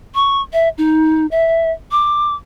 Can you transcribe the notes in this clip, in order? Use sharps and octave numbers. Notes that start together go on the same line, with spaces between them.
C#6
E5
D#4
E5
D6